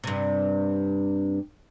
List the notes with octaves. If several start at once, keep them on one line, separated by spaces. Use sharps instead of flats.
G2 C3